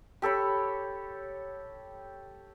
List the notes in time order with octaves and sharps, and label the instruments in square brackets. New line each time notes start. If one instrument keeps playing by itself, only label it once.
[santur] G4 A4 C#5 B5